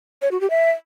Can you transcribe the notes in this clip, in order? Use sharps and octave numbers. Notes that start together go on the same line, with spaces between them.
C#5
F#4
G4
E5